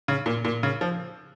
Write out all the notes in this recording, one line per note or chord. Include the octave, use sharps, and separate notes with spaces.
C#3
A#2
A#2
C#3
F3